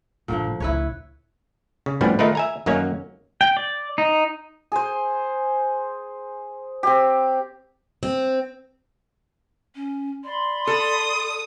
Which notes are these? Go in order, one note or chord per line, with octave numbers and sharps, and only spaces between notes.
G2 A#2 D3 F3 B3
A2
C#2 A2 E4 B4 C#5
C#3
A2 F3 G3 B3 C#4 D4
D#3 A3 D#4 F4 A#4 B4
E5 G#5 A#5
F#2 D#3 F#3 A#3 C#4 C#5
G5
D5
D#4
G#4 C5
C4 G4
C4
C#4
D5 B5 C6
A4 D#6